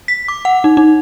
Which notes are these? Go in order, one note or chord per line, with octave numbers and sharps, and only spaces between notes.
B6
D6
F#5
D#4
D#4